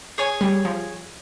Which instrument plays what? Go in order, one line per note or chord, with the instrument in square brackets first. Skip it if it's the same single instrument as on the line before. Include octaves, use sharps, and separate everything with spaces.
[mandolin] G#4 C#5 G#5
[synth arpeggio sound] G3
F3